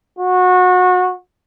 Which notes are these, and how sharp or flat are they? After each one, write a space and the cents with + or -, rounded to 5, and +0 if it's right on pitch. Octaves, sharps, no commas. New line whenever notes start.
F#4 -25